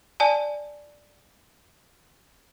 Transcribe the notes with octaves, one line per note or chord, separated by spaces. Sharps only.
D5 G#5 A5